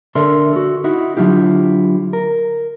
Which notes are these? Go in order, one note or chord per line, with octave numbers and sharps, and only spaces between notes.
D3 A4 A#4 D5 E5 C6
F#4 A4
D#4 E4 F#4
D3 F#3 E4 F4 G4
A#4